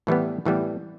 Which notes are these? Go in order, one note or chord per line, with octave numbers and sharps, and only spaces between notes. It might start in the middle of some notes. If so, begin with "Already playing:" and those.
A2 E3 G3 B3
A2 E3 G3 B3